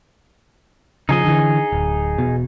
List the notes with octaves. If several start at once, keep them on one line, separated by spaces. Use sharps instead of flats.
C#3 F3 D#4 G#4 D#5
D3 E3
D1
E1 B2